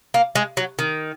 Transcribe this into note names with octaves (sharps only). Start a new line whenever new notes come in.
A#3
G#3
F#3
D#3